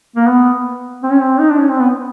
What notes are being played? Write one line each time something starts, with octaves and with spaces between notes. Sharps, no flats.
A#3
B3
C4
C#4
C4
D#4
D4
C#4
C4
B3